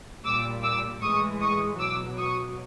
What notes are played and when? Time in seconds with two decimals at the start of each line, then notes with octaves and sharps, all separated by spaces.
0.24 A#2 G3 D6 E6
0.63 D6 E6
1.01 A2 E3 G#3 C#6 D#6
1.41 C#6 D#6
1.79 B2 F#3 D6 E6
2.17 C#6 D#6